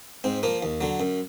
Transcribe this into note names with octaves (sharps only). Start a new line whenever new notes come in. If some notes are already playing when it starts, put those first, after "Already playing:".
G#2 C4
F3 A#3
D#2
D3 F#3
F#2